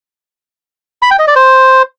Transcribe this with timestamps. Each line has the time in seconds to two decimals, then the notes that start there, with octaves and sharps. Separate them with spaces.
1.02 B5
1.11 G5
1.19 D#5
1.27 D5
1.36 C5